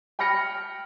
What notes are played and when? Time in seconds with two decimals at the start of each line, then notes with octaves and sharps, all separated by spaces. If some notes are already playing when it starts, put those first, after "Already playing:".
0.19 G5 B5 F6 A#6 C#7